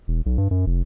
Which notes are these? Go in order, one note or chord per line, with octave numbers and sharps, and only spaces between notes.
E1
B1
G2
F#2
F1